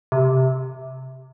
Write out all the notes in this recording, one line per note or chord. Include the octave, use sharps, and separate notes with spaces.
C3